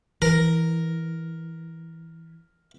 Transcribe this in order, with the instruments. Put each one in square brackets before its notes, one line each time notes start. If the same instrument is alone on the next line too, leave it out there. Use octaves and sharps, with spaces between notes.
[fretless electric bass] E3 [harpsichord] A#4